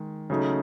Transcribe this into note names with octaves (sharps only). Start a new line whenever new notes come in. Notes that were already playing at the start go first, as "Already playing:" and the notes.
Already playing: D#3 G#3
C#3 F#3 A3 D#4